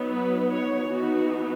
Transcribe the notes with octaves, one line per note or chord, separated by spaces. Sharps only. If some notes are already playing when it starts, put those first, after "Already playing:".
Already playing: F#3 B3 D#4
B4
C#5
E3 B3 D#4 F#4